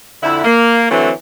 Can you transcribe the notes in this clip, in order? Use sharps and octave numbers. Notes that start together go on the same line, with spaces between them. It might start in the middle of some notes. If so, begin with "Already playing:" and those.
F2 D3 E4
A#3
D3 E3 F#3 A3 C4